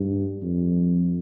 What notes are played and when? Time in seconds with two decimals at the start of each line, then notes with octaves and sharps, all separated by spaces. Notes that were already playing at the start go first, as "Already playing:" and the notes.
Already playing: G2
0.42 F2